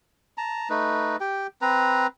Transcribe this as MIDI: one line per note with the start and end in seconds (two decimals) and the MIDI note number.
0.38 0.69 81
0.38 0.69 82
0.70 1.17 57
0.70 1.17 63
0.70 1.17 71
1.20 1.47 67
1.20 1.47 79
1.62 2.07 60
1.62 2.07 71
1.62 2.07 82